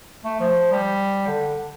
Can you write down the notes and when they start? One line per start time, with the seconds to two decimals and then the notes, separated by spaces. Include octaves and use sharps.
0.25 A3
0.40 F3
0.72 G3
1.27 D3